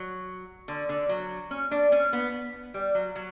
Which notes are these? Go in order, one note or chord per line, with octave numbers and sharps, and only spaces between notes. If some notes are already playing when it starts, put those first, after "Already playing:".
Already playing: F#3
D3
D3
F#3
C#4
D4
C#4
B3
G3
F#3
F#3